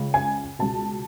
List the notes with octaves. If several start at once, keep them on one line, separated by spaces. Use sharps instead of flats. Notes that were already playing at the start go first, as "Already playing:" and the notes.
Already playing: C#2 C#3
G#5
C#2 B2 A5